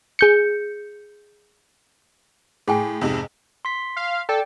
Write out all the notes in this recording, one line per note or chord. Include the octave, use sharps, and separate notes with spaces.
G#4 G6 C#7
A2 G#4 G5 G#5
F2 G#2 C3
C6 B6
F5
A4 D5 G5